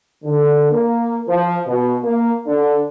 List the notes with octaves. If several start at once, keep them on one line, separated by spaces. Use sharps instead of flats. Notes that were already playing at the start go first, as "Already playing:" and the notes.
D3
A#3
F3
B2
A#3
D3